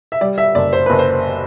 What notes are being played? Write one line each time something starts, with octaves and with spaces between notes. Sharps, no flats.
E5
G3 D5
E5
F#1 D5
C5
F#1 B4
C5